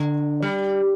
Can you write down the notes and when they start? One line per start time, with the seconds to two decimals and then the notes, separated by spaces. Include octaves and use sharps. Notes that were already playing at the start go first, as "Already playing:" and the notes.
Already playing: D3
0.42 G3